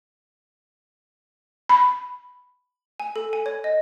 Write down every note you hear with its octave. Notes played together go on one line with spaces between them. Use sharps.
B5
G#5
A4
G#5
C#5
D#5